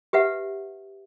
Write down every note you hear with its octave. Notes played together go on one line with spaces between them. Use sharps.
G4 B4 E5 F#5